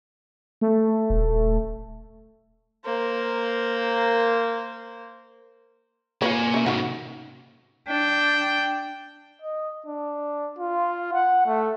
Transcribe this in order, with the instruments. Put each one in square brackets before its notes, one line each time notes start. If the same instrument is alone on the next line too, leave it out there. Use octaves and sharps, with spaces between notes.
[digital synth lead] A3
[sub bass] D#1
[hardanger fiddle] A#3 C5
[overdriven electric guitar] A#3 G#5 [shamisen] F4 B4 C#5
[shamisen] C#4 E5
[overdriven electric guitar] C3 D#3 [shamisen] C#4 F4 F#4
[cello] D4 [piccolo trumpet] G5
[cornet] D#5
D4
F4
F#5
A3